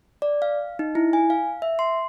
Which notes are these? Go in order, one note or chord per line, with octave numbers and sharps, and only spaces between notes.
D5
F5
D#4
E4
G#5
F5
E5
C6